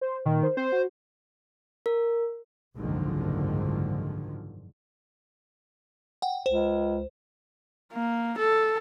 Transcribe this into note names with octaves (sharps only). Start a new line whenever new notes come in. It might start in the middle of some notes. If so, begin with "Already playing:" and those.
C5
A#2 D#3
C5
C4 C5
F#4
A#4
F#1 C2 G#2 D3 D#3 F3
F#5 G5
C#2 C5
A#3
A4